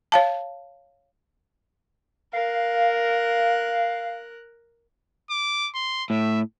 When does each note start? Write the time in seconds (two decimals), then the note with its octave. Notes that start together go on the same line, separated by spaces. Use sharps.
0.12 C#5 F5 A5
2.33 A#4 F5 F#6
5.30 D6
5.75 C6
6.10 A2 E5